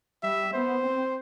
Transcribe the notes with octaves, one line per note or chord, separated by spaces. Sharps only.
G3 E5
B3 C5
C4